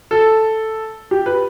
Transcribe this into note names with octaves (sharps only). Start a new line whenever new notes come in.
A4
G4
B4